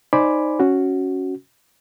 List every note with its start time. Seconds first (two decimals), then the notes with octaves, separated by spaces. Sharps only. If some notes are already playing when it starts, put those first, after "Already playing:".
0.13 D#4 C5 D5 G#5 B5 D6
0.60 C#4 F#4